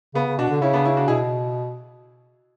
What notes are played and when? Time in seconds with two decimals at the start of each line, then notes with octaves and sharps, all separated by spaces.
0.15 C#3 B3
0.27 C#3
0.39 B2 D4 F#4
0.50 D3
0.61 C#3 C#4 E4
0.73 B3 D4
0.85 C#4 E4
0.97 D4 F#4
1.08 B2 E4 G#4